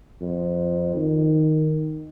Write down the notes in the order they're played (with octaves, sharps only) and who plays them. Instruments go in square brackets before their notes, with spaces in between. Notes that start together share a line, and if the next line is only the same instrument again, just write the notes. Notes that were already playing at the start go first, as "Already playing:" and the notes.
[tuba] F2
D#3